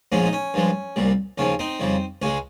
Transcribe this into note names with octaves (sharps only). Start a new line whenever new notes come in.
A#1 G#2 F3 G#3 C#4
D#4
C#4
G2 F3 G#3
C2 A#2 G3
D#2 C#3 F3 C#4
C4 D#4
F2 C#3 G3
C#2 C#3 G#3 C#4